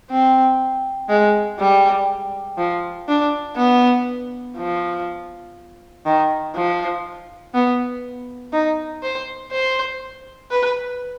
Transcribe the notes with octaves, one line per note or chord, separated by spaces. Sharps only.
C4
G#3
G3
F3
D4
B3
F3
D#3
F3
B3
D#4
C5
C5
B4